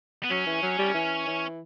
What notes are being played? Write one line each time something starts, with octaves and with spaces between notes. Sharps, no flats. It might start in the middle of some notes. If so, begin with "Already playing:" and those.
B3
F#3 C#4
E3
F#3
G3
E3
E3